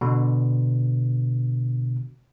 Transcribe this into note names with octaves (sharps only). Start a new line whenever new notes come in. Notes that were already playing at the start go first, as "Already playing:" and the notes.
B2 D3